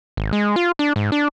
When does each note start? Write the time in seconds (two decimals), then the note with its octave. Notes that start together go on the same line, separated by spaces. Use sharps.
0.17 G#1
0.33 G#3
0.56 F4
0.79 D4
0.96 G#2
1.12 D4